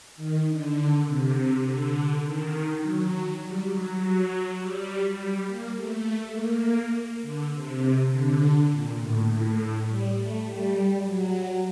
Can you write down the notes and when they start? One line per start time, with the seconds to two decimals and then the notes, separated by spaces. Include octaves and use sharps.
0.16 D#3
0.47 D3
1.05 C3
1.64 D3
2.23 D#3
2.81 F#3
3.41 G3
3.70 F#3
3.98 F#3
4.58 G3
5.16 G3
5.46 A#3
5.76 A3
6.34 A#3
7.22 D3
7.51 C3
8.11 D3
8.69 A#2
8.99 A2
9.27 A2
9.86 G3
10.15 A3
10.46 G3
11.05 F#3